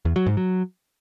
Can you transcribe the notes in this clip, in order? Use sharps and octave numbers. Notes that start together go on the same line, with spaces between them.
E2
F#3
G#2
F#3